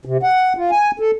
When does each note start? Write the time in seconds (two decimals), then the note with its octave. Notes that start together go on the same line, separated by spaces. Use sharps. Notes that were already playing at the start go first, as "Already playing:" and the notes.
0.05 C3
0.23 F#5
0.57 F4
0.71 G#5
0.99 A4